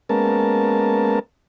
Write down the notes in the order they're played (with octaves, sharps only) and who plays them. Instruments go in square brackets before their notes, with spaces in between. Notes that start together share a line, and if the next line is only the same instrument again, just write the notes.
[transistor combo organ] G#3 A#3 B3 C#4 A#4 A5